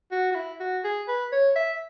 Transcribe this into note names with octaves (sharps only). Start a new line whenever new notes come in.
F#4
F#4
E4
F#4
G#4
B4
C#5
E5